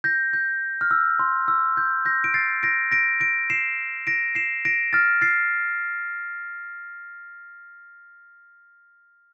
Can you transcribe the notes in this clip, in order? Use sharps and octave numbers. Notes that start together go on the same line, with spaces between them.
G6 A#6
G6
F6
E6
C6
E6
G6
G6 A#6
D7
A6 C7
A#6 D7
A#6 D7
A#6 D7
C7 E7
A#6 D7
C7 E7
A#6 D7
F6 A6
A6 C7